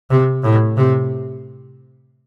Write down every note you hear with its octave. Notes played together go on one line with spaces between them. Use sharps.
C3
A2
C3